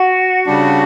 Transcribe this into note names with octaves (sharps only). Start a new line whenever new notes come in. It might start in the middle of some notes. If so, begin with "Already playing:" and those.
Already playing: F#4
C#3 G3 D4